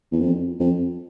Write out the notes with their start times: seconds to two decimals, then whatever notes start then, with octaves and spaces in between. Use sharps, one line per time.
0.12 E2
0.21 F2
0.60 F2